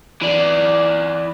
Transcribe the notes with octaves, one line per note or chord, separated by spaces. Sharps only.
E3 D5